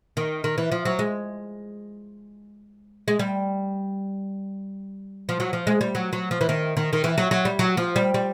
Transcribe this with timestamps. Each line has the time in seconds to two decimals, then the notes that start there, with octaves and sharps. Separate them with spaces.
0.17 D#3
0.44 D#3
0.58 E3
0.72 F3
0.85 F#3
0.99 G#3
3.08 G#3
3.19 G3
5.29 F3
5.40 F#3
5.53 F3
5.67 G#3
5.81 G3
5.95 F#3
6.13 F#3
6.31 F3
6.41 E3
6.49 D#3
6.77 D#3
6.93 D#3
7.04 E3
7.18 F#3
7.31 F#3
7.45 G3
7.59 F#3
7.77 F3
7.96 G3
8.14 G3